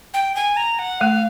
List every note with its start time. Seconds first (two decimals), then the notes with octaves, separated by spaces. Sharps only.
0.14 G5
0.35 G#5
0.57 A#5
0.79 F#5
1.00 A3 F5